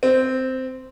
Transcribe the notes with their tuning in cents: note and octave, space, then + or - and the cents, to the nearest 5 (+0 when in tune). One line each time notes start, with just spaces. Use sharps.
C4 -10 C5 +0